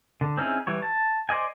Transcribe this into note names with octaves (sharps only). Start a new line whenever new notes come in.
D3
C4 C#4 D#4 E4 G#4
E3 G3 C#5
A5
C5 D5 D#5 G#5